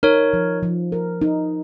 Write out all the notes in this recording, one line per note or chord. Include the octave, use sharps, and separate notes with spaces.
D#4 A#4 C#5
F3
F3
A#4
D#4